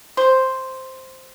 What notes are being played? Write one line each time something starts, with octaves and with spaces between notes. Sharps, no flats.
C5